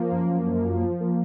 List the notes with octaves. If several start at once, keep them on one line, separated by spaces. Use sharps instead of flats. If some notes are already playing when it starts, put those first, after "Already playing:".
Already playing: F3 A#3
F#2
F#2
F#2
F3
F3
A#3